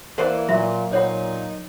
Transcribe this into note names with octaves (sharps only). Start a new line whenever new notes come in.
E3 A#3 B4 C5 D5 F#5
A#2 F#3 E5
A#2 D#4 C5 C#5 F#5